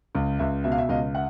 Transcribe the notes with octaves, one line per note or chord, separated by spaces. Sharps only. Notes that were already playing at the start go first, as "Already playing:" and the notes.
C#2
C#2 E5
B2 E5
F5
E5
C#2 D#5 F5
E5 F#5